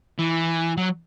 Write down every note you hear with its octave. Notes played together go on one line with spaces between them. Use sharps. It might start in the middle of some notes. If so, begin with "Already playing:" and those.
E3
F#3